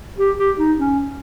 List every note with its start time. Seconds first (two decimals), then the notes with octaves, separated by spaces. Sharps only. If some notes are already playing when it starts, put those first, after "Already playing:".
0.18 G4
0.38 G4
0.59 D#4
0.78 C#4